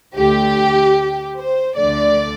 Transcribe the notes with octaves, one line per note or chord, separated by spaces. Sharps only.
D2 D3 A3 G4
C5
D2 D3 A3 D5